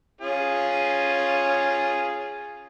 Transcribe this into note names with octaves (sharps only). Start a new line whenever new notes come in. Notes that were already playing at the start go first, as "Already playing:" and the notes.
C#4 F4 G#4